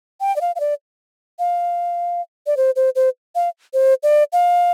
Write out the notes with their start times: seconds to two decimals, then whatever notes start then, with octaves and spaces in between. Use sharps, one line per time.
0.21 G5
0.36 D5
0.41 F5
0.56 F5
0.60 D5
1.39 F5
2.47 D5
2.57 C5
2.76 C5
2.95 C5
3.35 F5
3.73 C5
4.03 D5
4.33 F5